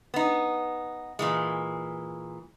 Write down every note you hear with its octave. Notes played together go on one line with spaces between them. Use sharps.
B3 D#4
A#2 E3 G#3